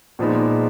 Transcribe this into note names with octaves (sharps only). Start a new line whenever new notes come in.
A#2 F3 G#3 B3 D#4